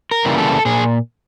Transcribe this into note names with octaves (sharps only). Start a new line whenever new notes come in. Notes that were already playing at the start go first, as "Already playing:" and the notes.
A#4
C#3 E3 G3 A#3
A4
A#2 G#4